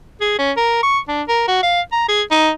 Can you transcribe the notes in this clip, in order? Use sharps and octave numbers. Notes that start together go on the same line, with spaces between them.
G#4
C#4
A#4
C#6
D4
A#4
F#4
F5
A#5
G#4
D#4